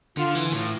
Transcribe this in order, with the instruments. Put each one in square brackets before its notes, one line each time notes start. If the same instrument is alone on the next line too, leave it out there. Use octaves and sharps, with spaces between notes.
[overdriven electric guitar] D3 [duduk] F4
[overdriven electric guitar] E3
A2